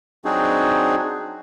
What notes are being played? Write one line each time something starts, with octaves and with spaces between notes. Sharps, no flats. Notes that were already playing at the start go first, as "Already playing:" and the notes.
F#3 C4 D4 D#4 F#4 G#4